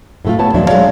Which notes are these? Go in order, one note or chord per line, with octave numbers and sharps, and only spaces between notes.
A2 A3 F4
A3 B3 C#5 A5
D#2 A#2 F3 F#3 D4 E5
F#3 G#3 A#3 C#5 D5 F5